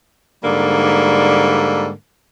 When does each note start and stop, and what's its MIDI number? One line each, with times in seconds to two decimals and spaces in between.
0.42 1.91 44
0.42 1.91 50
0.42 1.91 55
0.42 1.91 58